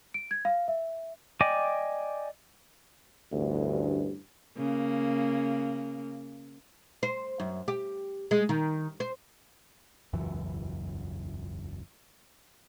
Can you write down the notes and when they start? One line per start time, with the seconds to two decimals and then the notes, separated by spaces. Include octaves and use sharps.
0.14 D7
0.31 G#6
0.45 F5
0.68 E5
1.41 D5 D#5 G5 G#5 D6
3.32 A1 D2 G2
4.57 C#3 A#3
7.03 C5
7.40 F#2
7.68 G4
8.31 G#3
8.49 D#3
9.00 C5
10.13 E1 C#2 F#2 E3